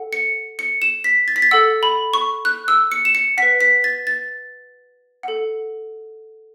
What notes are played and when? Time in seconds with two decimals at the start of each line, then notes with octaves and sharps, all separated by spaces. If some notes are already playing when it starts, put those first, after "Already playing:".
Already playing: A4 F#5
0.13 C#7
0.59 C#7
0.82 E7
1.04 B6
1.28 A6
1.36 B6
1.42 A6
1.51 A4 F#5 E6
1.83 B5
2.14 C#6
2.45 F#6
2.68 E6
2.92 C#7
3.05 E7
3.15 C#7
3.38 B4 F#5 B6
3.61 B6
3.84 A6
4.07 A6
5.23 A4 F#5